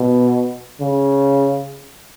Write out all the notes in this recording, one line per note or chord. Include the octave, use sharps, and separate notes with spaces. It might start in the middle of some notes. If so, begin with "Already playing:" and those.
Already playing: B2
C#3